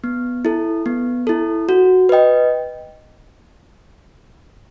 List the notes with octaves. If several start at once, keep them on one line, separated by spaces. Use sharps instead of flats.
B3
E4 A4
B3
E4 A4
F#4
B4 D#5 G5